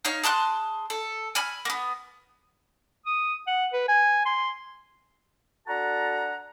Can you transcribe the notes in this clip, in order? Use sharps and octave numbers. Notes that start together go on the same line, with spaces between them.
D#4 C#5 F5
G#4 A5 C6 F#6
A4
G#5 B5 F6
A#3 B3
D#6
F#5
B4
G#5
C6
D4 F#4 A4 F#5 A5 A#5